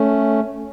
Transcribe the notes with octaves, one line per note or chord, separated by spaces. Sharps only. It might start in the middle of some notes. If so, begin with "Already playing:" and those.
Already playing: A3 C#4